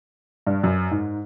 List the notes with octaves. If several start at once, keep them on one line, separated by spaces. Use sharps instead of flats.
G2
F#2
G#2